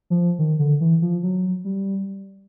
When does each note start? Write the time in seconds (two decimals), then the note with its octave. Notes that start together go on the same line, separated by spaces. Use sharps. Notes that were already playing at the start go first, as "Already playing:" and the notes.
0.10 F3
0.39 D#3
0.59 D3
0.81 E3
1.02 F3
1.23 F#3
1.65 G3